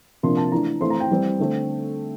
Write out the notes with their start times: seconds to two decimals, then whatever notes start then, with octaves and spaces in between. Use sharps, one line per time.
0.23 C3 F3 A#3 D4 C6
0.37 A5
0.52 E3 A3 D4 A#5
0.80 E3 A3 C4 C6
0.90 A#5
1.00 G5
1.11 E3 G3 C4
1.39 D3 A3 C4